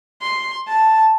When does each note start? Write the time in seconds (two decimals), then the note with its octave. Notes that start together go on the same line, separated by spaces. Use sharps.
0.22 C6
0.68 A5